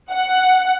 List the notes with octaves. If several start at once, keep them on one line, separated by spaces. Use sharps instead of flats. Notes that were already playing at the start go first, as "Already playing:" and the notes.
F#5